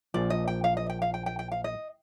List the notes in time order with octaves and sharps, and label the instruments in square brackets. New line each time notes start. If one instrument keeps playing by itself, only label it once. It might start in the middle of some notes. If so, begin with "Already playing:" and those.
[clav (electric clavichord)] A#1 A#2 F3 [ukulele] D5
[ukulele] D#5
G5
F5
D#5
G5
F5
G5
G5
G5
F5
D#5